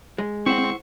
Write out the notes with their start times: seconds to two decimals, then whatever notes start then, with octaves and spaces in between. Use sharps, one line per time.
0.18 G#3
0.46 C4 E4 C5 F#5 C#6